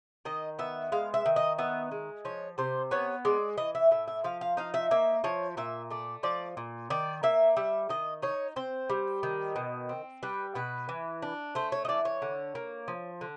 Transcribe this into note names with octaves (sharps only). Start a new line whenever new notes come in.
D#3 D#5
B3 E5
G#3 F5
E5
D#3
D#5
B3 E5
G#3
F3 C#5
C3 C5
B3 C#5
G#3 D5
E3 D#5
E5
A2 E5
E5
F3 F5
F5
D#4 F5
E5
A#3 E5
F3 C#5
A#2 E5
A3 D5
F3 D5
A#2
D#3 D5
A#3 E5
G3 E5
D#3 D#5
D#4 C#5
C4 C5
G3
D#3
B2
C4
G3 B4
B2 B4
E3
D4
A3 C5
C#5
D#5
E3 D5
C#5
D3
A#3
F3
D3